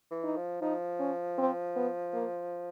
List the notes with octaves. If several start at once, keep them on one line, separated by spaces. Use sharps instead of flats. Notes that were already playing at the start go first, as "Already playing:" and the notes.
E3
D#4
F3
F3 D#4
C#4
C4
B3
A#3